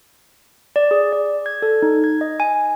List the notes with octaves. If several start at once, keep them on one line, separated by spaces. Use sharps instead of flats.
D5
G#4
D5
G#6
A4
D#4
G#6
D#5
G#5